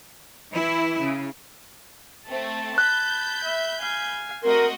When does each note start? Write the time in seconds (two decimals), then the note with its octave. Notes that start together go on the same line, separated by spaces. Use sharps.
0.55 E3 E4
1.01 C#3
2.28 A3 C4 A5
2.78 B5 F#6 G6
3.43 E5
3.80 F5 G#5
4.43 A3 C4 F#4 A#4 D#5 C6